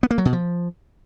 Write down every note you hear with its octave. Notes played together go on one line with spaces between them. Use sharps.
B3
A#3
F#3
B2
F3